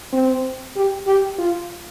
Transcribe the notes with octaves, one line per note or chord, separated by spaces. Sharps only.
C4
G4
G4
F4